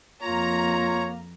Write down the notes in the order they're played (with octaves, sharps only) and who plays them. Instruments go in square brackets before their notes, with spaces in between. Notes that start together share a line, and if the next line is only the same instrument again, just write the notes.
[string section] F2 A#5 [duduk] A#3 [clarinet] F4 [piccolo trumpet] C#5